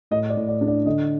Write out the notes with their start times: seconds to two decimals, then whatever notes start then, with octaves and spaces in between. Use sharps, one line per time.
0.11 A2 D#5
0.30 D5
0.36 A2
0.48 D5
0.61 D4
0.68 D5
0.86 D3 D#5